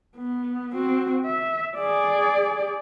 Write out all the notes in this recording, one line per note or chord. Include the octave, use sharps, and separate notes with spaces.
B3
C4 F#4
E5
G#4 D5